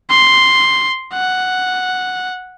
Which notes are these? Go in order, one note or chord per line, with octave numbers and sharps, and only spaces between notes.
C6
F#5